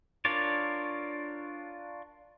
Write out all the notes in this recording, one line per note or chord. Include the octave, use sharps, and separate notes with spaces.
D4 F4 A#4 C#5 D5